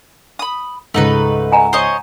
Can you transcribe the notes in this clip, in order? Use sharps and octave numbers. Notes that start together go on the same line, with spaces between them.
B5 D#6
C#2 G#2 A3 D#4 B4
F#5 G#5 A#5
C5 C#5 D#5